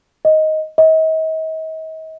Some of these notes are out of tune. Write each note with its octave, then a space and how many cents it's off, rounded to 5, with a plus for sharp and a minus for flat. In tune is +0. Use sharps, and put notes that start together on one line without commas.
D#5 +10
D#5 +40